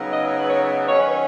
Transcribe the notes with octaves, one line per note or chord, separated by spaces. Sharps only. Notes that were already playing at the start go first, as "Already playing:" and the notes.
Already playing: C#3 F#3 B3 D#4
D#5
C#5
B4
C#5
D#3 F#3 C#4 C#5
B4
C#5